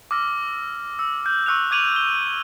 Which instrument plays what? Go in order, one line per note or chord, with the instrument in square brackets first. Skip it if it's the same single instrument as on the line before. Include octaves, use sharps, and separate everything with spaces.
[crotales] D6 E6 F6 A#6
E6
F6 G6
C#6 E6 F#6 F7
D6 G#6 D#7 F7 F#7
G7